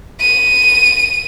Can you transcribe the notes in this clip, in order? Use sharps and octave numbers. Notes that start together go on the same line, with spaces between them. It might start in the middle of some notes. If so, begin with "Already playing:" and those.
D#7